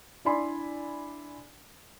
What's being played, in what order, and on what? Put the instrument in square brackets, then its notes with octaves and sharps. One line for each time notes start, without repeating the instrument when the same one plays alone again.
[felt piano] D4 E4 D5 G#5 B5 C6